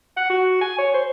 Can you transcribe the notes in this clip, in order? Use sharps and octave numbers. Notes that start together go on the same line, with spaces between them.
F#5
F#4
G#5
C#5
C5